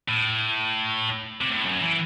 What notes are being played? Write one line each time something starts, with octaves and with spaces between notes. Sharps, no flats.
A2
C3
A2
F#2
E3